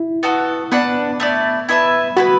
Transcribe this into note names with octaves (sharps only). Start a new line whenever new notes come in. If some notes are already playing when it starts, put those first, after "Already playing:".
Already playing: E4
B3 F#4 A4
B3 D4 B4 F#5
A3 E4 D5
E4 B4 E5 A5
B3 E4 F#4 B4